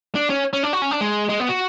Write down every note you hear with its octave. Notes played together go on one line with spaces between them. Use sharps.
D4
C#4
C#4
D4
F#4
C#4
D4
G#3
G#3
B3
F#4